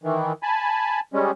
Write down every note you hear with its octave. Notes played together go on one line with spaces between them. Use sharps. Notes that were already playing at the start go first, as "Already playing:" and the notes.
D#3 E3
G#5 A5 B5
G3 G#3 C#4